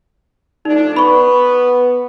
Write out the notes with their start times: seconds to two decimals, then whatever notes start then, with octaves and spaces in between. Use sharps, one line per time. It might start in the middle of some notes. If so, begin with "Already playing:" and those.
0.65 F3 A3 D4 D#4
0.96 B3 B5 C#6